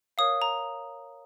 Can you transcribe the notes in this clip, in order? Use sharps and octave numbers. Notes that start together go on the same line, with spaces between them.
A#4 C#5 F5 D#6
A#5